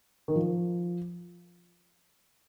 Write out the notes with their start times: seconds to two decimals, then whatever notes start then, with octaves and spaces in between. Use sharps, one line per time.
0.28 D#3
0.36 F3